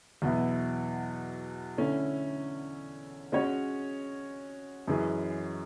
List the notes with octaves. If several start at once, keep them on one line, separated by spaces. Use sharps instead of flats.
E2 B2 F#3 B3 E4
D3 A3 C#4 E4
G#3 C#4 F#4 C#5
F#2 E3 G#3 C#4 G#4